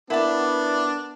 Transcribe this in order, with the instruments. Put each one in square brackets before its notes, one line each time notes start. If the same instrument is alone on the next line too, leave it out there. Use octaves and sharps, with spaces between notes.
[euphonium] B3 [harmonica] D4 [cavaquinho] E4 D5 [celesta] A#4 F#5